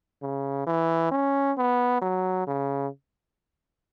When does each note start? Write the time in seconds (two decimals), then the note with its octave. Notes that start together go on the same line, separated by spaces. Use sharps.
0.22 C#3
0.67 E3
1.12 C#4
1.58 B3
2.02 F#3
2.47 C#3